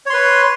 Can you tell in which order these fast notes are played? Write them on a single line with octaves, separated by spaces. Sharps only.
C#5 C6 B4